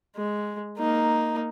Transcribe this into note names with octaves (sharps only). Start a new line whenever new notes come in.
G#3
A#3 D#4